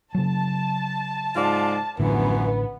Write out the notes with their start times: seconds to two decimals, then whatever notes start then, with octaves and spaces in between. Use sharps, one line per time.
0.15 C#3 F#3 A5
1.36 G#2 F4 D5
1.99 A1 F#2 A2 D3 E3 F3 B3